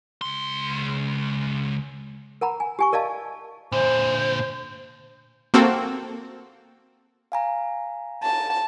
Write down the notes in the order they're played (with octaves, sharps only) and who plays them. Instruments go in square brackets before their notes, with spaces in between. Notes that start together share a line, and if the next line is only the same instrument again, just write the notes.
[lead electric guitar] C#2 C6
[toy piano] A#4 F#5 A#5 B5
G#5
G4 G#5 C#6
A#4 D5 D#5 F5 A5
[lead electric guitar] A#2 D3 [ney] C5
[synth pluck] A#3 C4 F#4 A4
[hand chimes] F5 G#5 A#5
[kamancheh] A5